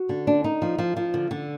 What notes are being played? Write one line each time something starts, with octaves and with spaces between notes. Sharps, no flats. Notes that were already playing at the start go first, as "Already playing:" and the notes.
Already playing: F#4
D3
D4
D#4
F3
F3
F3
D3
D3